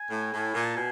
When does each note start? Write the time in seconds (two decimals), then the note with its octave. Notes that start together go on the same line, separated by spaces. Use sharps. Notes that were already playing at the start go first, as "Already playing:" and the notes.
Already playing: G#5
0.10 A2
0.32 A2
0.54 A#2
0.65 A5
0.75 B2 G#5